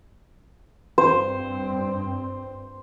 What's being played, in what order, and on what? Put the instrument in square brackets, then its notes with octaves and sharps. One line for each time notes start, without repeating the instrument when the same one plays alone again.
[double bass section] G2 C4 [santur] C5